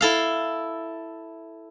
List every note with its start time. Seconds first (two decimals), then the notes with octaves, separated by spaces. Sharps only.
0.01 E4 A4 F5